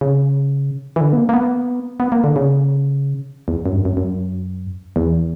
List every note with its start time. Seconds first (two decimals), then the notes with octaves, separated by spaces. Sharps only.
0.01 C#3
0.96 E3
1.01 D3
1.13 B3
1.17 A#3
1.29 A#3
1.33 B3
2.00 B3
2.12 A#3
2.24 D3
2.36 C#3
3.48 E2
3.66 F#2
3.73 G2
3.85 F#2
3.97 F#2
4.96 E2